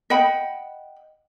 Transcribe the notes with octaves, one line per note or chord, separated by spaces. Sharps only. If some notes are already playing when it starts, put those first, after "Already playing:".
D#5 F#5 G5 B5